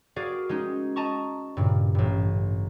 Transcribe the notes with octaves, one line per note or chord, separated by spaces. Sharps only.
F#4 G#4 A#4 D5 F5
G#3 C#4 D#4
D#5 A5 A#5 C#6
G2 A#2 C#3
A1 G2